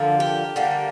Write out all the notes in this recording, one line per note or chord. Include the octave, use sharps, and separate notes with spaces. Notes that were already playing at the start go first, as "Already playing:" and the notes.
Already playing: D3 F3 A#3
G4
D3 G3 A#3